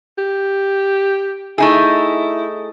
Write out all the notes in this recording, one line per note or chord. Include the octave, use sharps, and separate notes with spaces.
G4
A3 D#4 E4 G#4